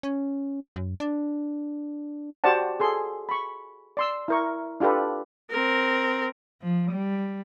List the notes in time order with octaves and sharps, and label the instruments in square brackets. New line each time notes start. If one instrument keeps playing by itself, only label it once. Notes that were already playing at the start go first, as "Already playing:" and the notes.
[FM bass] C#4
F#2
D4
[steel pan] F#4 G4 C5 D5 F#5 A5
G#4 A4 C6
B5 C#6
D5 C6 E6
E4 A#4 C#6
D4 F4 G4 A4 B4
[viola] C4 A#4
[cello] F3
G3